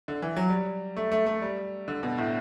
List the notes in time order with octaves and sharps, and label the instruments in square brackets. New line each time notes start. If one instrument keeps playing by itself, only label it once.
[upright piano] D3
E3
F#3
G3
A3
A3
A3
G3
D3
B2
A2